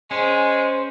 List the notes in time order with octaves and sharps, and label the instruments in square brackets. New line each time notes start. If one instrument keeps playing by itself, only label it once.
[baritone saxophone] G#3 [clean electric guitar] C#4 [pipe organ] C5